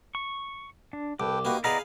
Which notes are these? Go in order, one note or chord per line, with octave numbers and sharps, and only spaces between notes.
C#6
D4
C2 A4 B4 G5 D6
A#3 D#4 F#4 G4 B4
B3 E4 G#4 B4 D5 D#5 F5 A#5